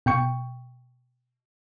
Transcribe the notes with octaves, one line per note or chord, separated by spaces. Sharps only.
B2 G5 C#6